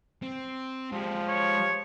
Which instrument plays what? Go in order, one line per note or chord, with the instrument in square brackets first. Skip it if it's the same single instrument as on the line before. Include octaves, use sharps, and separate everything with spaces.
[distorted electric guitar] C4
[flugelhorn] F3 [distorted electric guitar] G#3 G4
[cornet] C#5